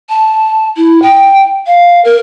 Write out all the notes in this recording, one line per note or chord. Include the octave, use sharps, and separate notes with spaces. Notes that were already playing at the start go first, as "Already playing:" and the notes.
A5
E4
G5
F5
A#4